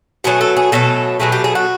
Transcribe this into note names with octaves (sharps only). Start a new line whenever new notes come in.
B2 F#3 A3 G#4
A4
G#4
B2 F#3 A3 A4
B2 F#3 A3 G#4
G4
G#4
F#4